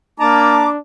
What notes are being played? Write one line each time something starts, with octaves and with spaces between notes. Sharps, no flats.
A#3 D4 A5 A#5 D6